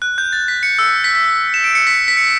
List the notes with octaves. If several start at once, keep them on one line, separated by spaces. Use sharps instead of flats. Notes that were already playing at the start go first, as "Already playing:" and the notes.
F#6
G6
A6
B6
C#7
E6
B6
B6
E7
D7
C#7
B6
B6
C#7